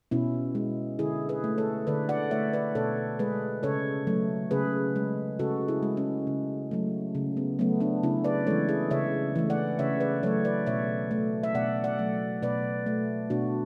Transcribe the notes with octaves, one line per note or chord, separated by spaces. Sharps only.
B2 C#4 E4
G#3
D3 E4 G#4
G#4 B4
A3
A4 C#5
D3 B4 D5
D5 F#5
A3 C#5 E5
B4 D5
B2 A4 C#5
G#3 G#4 B4
C#3 A4 C#5
F#3 A3
C#3 G#4 B4
G#3
C#3 F#4 A4
E4 G#4
G#3
C#4
C#3
F#3 A3
C#3
B3
F#3 A3 B3
B3 D4
C#3 C#4 E4
B4 D5
E3 G#3 A4 C#5
E4 G#4
C#3 C#5 E5
E3 A3
D5 F#5
C#3 C#5 E5
B4 D5
F#3 A3 A4 C#5
B4 D5
B2 C#5 E5
A3
E5
B2 D5 F#5
D5 F#5
F#3 A3
B2 B4 D5
A3
B2 D4 F#4